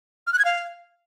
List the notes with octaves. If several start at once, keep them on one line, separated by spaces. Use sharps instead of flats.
F6
F#6
G#6
F5